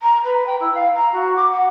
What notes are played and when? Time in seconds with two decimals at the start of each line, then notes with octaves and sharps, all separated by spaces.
0.02 A#5
0.24 B4
0.46 G5
0.60 E4
0.74 F5
0.95 A#5
1.12 F#4
1.36 D6
1.52 F#5